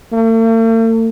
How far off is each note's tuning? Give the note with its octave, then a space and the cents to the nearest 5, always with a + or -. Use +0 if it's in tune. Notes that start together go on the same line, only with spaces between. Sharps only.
A3 +45